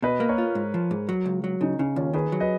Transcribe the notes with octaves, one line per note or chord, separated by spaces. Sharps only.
B2 B4 D#5
A#3
A#4 C#5
F4
G#2
F3
G#2
F#3
C#2
F#3
C#3 D#4
C#3 D#4
D#2 C#4 F4
D#3 G#4 B4
F#3
B4 D#5